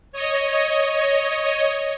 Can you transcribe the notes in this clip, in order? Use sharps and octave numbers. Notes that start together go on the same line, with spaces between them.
C#5 D#5